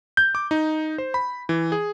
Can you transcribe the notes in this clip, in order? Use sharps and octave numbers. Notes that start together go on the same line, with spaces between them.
G6
D6
D#4
C5
B5
E3
G#4